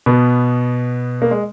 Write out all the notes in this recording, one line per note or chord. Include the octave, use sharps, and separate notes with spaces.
B2 B3
A#3
G#3